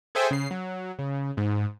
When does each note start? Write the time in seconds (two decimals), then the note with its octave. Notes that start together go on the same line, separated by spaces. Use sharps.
0.15 G#4 A4 C5 E5 G5 G#5
0.31 C#3 C7
0.51 F#3
0.99 C#3
1.37 G#2